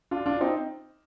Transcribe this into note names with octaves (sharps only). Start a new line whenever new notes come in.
D4 F4
D4 F4
C4 D#4